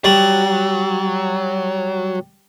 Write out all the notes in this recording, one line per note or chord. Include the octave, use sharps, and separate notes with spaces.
F#3 G3